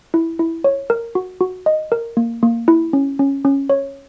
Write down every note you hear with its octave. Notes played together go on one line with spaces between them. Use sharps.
E4
E4
C#5
A#4
F#4
F#4
D#5
A#4
A#3
A#3
E4
C#4
C#4
C#4
C#5